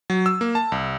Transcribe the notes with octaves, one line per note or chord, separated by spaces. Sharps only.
F#3
E6
A#3
A5
C2